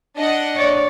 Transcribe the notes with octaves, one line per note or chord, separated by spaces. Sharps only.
D4 D#5 F#5
C#5 D5